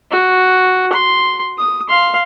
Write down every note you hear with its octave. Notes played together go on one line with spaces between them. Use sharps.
F#4
C6
D#6
F5 C6